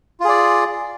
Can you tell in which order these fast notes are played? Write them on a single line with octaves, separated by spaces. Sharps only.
F4 G#4 D5